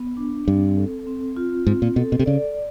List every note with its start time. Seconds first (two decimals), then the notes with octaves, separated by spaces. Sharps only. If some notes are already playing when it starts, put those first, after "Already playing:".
Already playing: B3
0.17 D4
0.46 G2 C4
0.77 A4
1.07 C4
1.37 F4
1.66 G#2 C4
1.82 A#2
1.96 B2 A4
2.12 B2
2.19 C3
2.26 C#3 D5